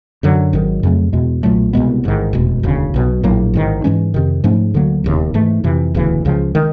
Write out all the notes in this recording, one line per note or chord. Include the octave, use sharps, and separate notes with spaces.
F#2 D3 F#3
G#1 G#2 D#3 F#3
F2 C#3 F#3 A3
E2 B2 G#3
B1 A#2 F#3 A3
C2 B2 G#3 B3
A1 G#2 D#3
F1 E2 B2 G#3
E1 D2 C#3
B1 B2 F#3
A#1 A2 F#3 A#3
A1 G#2 D#3
G#2 E3 G#3 C#4
F2 C3 D#3
G#2 F3 A3 C#4
D2 D3 F#3 A#3
E1 D#2 C#3
G#2 E3 A3
F2 C3 E3
E1 D2 C#3 E3
C#2 C#3 F3
D#3 G#3